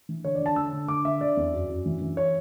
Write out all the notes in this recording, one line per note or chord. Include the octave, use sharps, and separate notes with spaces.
E3
D3 C#5
D5
D3
A5
D3 E6
D3
D3 D6
D3 E5
D3 D5
E2
F#2
F#2
E3
E3
C#5